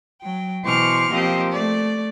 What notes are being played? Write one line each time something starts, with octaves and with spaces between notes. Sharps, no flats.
F#3 G5
B2 E3 C5 C#6 D6 F6
F3 A#3 C4 G4 D#5
A3 D5